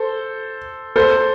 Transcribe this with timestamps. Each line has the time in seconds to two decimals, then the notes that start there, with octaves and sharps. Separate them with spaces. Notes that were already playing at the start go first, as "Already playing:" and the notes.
Already playing: A4 C5
0.96 A4 C5